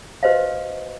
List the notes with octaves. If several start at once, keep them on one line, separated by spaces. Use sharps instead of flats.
F#4 B4 C5 D#5 F5